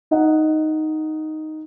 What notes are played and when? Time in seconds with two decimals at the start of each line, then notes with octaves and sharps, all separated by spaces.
0.11 D#4 D#5 F#5